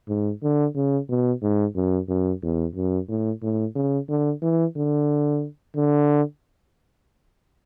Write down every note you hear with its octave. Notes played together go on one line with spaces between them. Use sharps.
G#2
D3
C#3
B2
G#2
F#2
F#2
E2
F#2
A2
A2
C#3
D3
E3
D3
D3